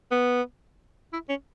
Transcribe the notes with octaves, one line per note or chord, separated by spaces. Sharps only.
B3
E4
C#4